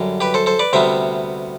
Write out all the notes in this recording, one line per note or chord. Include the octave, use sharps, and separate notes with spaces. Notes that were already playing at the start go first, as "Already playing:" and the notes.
Already playing: F#2 D3 G3
G4 B4
A4 C5
A4 C5
B4 D5
D2 C3 G3 B3 C5 E5